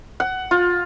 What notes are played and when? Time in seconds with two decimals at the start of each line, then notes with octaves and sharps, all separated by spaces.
0.20 F#5
0.51 F4